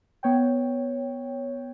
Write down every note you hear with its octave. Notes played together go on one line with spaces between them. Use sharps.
B3 C#5 G5